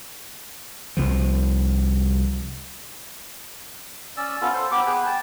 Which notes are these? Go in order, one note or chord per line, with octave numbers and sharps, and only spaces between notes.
C2 C3 F3
C#4 D5 E6
B3 C#4 F4 A4
A4 C5
B3 G4 D6
B3 G#4 B4 G5
G5 A5